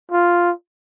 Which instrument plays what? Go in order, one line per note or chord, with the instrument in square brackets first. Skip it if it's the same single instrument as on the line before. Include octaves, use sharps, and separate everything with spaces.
[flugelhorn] F4